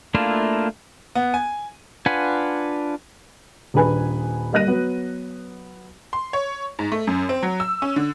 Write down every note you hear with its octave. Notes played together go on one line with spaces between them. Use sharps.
A3 A#3 D4 E4 F4
B3
G#5
D4 F4 B4 F#5 G#5
D#1 D4 G#4 B4 G#5
G3 A#3 D#5 F#6 A#6 D#7
F#3 B3
C6
C#5
G#2
A3
F#2
C4
F#3
E6
C#4
D3